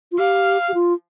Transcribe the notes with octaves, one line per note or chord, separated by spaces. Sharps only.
F4
G4 F5
G4
F4